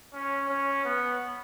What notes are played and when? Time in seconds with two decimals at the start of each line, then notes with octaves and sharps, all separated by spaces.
0.14 C#4
0.49 C#4
0.85 B3